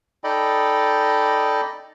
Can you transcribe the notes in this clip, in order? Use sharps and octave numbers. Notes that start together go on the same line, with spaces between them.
D#4 A4 D5 D#5 G5 B5